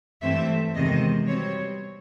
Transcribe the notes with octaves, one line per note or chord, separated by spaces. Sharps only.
G2 E3 A3 C4 E5
E2 C3 D#3 G#3 C4 D#5
B2 G3 C4 C#5